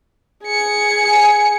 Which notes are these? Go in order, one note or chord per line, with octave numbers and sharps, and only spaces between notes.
G#4 C#7
G#5